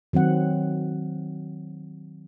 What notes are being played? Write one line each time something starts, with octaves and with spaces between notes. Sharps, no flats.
D#3 F#3 C4 F#5